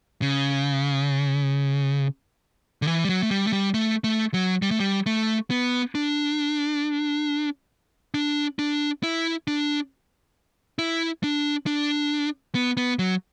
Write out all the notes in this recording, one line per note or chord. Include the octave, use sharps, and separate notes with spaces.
C#3
D3
E3
G3
F#3
A3
G3
A3
G3
A3
A3
F#3
G3
A3
G3
A3
B3
D4
D4
D4
E4
D4
E4
D4
D4
B3
B3
F#3